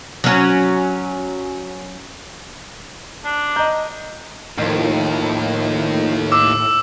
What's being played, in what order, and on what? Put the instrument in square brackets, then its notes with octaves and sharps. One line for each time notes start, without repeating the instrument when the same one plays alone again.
[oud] F#3 C#4
[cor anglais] D4
[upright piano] D#5 G6 [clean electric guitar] A#5
[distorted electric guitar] D#2 [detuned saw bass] A2 [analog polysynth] D#3 F3
[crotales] D6 E6